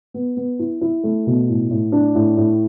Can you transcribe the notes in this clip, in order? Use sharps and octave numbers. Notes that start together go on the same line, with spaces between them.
B3
B3
E4
E4
A3
B2
A2
A2
D4
A2
A2